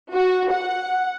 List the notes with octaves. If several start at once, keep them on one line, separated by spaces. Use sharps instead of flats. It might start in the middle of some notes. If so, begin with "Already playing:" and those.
F#4
F#5